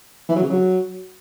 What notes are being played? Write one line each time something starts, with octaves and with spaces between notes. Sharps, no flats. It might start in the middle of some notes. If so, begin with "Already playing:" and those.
E3
F#3
C#3
F#3